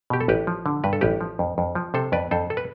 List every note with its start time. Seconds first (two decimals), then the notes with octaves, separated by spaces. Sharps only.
0.10 B2 G4
0.21 A4
0.28 A1 G4 B4
0.47 F3
0.66 D3
0.84 G2 B4
0.93 A4
1.01 A1 G4 B4
1.21 F3
1.39 F2
1.58 F2
1.75 F3
1.94 C3 A4 C5
2.12 F2 B4 D5
2.31 F2 A4 C5
2.50 A4
2.57 B4